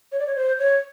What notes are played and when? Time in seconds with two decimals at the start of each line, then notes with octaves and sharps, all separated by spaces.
0.12 C#5
0.19 D5
0.27 C#5
0.36 C5
0.59 C#5